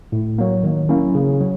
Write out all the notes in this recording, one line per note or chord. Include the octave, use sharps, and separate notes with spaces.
A2
F#3 A#3
D#3
F#3 A#3 C#4 E4
C#3
F#3